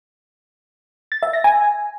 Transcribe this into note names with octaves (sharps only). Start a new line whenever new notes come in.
A6
E5
A#6
G#5